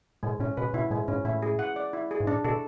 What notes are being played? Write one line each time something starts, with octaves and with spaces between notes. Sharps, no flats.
A2 G#3
A2 C#4
B2 B4
B2 E4
A2 G#3
G#2 C#4
A2 E4
G#4
F#5
D5
E4
G#4
G#2
A2 D4
B2 A4